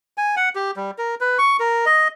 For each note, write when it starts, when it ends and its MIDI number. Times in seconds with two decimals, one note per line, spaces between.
0.18 0.35 80
0.36 0.49 78
0.55 0.71 67
0.76 0.91 55
0.98 1.15 70
1.21 1.38 71
1.38 1.57 85
1.60 1.85 70
1.86 2.08 75